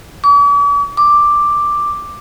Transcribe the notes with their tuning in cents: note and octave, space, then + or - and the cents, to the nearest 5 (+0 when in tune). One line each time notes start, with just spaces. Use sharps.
D6 -45
D6 +5